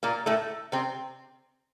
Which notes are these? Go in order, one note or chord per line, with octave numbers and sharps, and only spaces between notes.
A#2 A#3
A2 A3
C3 C4